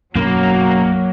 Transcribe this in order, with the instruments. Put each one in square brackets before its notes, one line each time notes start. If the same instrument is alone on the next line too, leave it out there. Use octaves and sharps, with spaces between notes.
[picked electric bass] B1 F#2 [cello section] F#3 [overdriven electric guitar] A#3